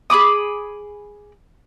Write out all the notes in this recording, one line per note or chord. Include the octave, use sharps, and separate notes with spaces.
G#4 B5 D6 D#6